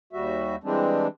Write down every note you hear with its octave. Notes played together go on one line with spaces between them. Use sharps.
D#2 G3 F#4 E5
E3 G3 G#3 C4 D4